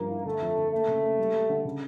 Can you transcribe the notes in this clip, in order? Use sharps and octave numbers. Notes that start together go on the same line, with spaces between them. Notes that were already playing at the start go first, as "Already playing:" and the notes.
Already playing: G2 F3 A#3
E4
D3 A3
F2
D3
A3 A#3
C#3
A#3
G3
G3
D3
C#3